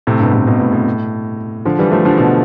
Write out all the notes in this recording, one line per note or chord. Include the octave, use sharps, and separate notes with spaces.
A2 C3
G2 B2
A2 C3
G2 B2
A2
A2
D3 F3
E3 G3
F3 A3
D3 F3
B2 D3